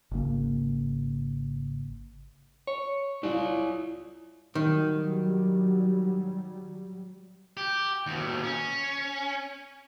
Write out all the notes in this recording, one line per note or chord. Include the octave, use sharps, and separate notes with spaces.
G#1 C#3 A#3
C#5
G3 E4 F4 D5
D#3 F#3 G3
G4
D#2 B2
C#4